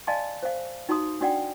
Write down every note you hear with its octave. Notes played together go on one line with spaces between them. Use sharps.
D5 D#5 F5 G#5 A5 C6
C5 F5
D#4 F#4 A#5 C6 D#6
D4 F#4 D5 F#5 G5